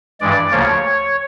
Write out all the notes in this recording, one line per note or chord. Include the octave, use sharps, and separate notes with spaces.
G2 E3 G#3 D5
D2 C#3 F3 A#3 C#5